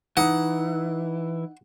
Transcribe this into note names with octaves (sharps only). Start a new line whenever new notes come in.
E3 D#4 F#5